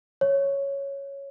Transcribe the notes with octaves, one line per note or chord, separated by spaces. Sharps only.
C#5